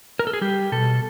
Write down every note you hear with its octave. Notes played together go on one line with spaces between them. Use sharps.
A#4
A4
G#4
G3 G4
B2 A4